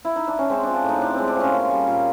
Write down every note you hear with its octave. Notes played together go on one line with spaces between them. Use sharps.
E4
D#4
D4
C#4
G#3 C4
F3 D4
D4
A2 D#4
A2 D4
G#3 C4
D4
F3 C#4
A#3
G3
A#2